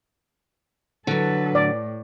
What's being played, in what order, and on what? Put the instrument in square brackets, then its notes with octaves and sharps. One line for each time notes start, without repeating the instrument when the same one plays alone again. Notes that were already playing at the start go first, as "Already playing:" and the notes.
[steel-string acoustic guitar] D3 F#3 [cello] A4 B4
[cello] A2 [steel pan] D5